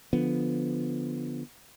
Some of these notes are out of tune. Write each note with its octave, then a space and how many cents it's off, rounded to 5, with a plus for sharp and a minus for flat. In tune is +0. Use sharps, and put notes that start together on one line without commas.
D3 +0 F3 +0 B3 +0